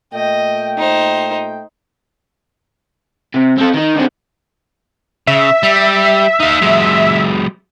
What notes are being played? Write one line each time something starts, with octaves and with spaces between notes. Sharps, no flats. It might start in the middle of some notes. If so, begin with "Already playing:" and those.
A#2 A3 D#5 G5
D#4 C5
C3
C4 A4
D#3 D#4
D3 C4
C#3 E5
G3
D#4 F5
F#3 G#3